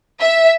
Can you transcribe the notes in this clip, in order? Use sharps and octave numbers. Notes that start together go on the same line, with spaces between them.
E5